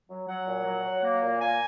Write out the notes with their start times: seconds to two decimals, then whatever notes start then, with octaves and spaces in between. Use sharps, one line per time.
0.09 F#3
0.28 F#3 F#5
0.46 A#2
0.66 F#3
0.84 F#3
1.04 A#3
1.22 A#2
1.41 A#3 G#5